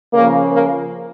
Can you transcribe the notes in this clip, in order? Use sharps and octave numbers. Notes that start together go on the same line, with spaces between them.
C#3 F3 A#3
A#3